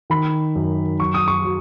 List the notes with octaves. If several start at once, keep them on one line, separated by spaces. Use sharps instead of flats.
D#3 B5
F#2
F#3 C#6
D#6
C#6
F#3